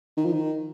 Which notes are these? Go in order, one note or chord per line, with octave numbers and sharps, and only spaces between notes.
D#3
F3
D#3